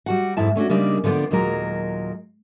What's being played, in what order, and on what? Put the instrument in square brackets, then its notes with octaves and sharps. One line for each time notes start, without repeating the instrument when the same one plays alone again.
[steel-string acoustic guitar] G3 F#4 F#5
F2 G#2 E4 A5
A3 C#4 D4 F#4
C#3 G3 G#3 A#3 D4 D#4
D3 F3 B3 C#4 D4
D#2 A#2 F#3 G#3 A#4